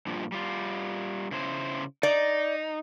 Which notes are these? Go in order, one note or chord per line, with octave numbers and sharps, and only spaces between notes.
G2 A#2 F3
G3 F4
C#3 E4 C5
D#4 D5